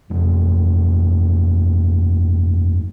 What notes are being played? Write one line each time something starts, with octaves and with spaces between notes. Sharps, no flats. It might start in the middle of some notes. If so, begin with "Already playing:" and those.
G1 F2